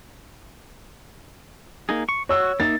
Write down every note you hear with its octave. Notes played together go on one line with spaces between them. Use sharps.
A#3 D#4 G#4
C#6
F#4 C#5 E6
A#3 D#4 E5 A6